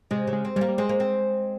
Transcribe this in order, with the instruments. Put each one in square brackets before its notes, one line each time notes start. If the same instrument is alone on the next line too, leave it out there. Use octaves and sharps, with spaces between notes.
[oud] C3 [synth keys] G#3
[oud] C#3
[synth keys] G#3
[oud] C4
[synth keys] G3 [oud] G#3
[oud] A#3
[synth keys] G3
[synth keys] G#3 [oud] C4
[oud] A#3
C4